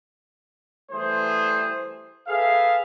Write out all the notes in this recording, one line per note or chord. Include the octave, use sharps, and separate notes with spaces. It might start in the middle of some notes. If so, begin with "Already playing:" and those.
E3 G3 A3 G#4 C5
G#4 A4 B4 E5 F5